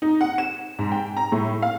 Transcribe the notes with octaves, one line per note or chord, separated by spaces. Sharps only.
D#4
F#5
E7
G#2
G5
A#5
A2
F5